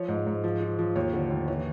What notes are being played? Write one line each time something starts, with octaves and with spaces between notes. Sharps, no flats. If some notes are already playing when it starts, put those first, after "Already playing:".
Already playing: F3 C#5
G#2
G#2
F3
F3
F3
D#2 C#5
D3
D#2
E3 C#5